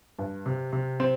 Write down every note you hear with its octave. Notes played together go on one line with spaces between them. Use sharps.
G2
C3
C3
C4